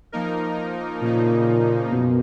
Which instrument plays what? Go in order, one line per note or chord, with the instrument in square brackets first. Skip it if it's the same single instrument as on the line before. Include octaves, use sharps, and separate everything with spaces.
[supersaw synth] F3 A#3 D#4 A#4
[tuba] A#2 [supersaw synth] C#3 F3 A#3 D#4
[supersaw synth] F#2 [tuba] B2